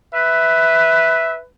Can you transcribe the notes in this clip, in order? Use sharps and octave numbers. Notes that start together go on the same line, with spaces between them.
B4 E5